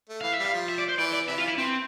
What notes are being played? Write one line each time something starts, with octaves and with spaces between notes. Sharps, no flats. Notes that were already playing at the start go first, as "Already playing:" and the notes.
A3
E3 F5
E5
G3
F5
F3
E5
D5
C5
E3 D5
D5
C3 E3 E5
F4
E4
E3 C4